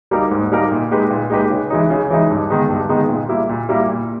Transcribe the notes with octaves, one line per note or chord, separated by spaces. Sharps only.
G3 A#3 D#4 A#4
G#2
G3 A#3 D#4 A#4
A#2
G#3 D#4 G4 B4
A#2
G#3 D#4 G4 B4
C#3
E3 G#3 D#4
C#3
E3 G#3 D#4
G2
D#3 G#3 B3 D#4
G2
D#3 G#3 B3 D#4
A#2
G3 A#3 E4
A#2
G3 A#3 E4
A#2